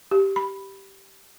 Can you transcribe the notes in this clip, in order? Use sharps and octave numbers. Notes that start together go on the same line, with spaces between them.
G4
B5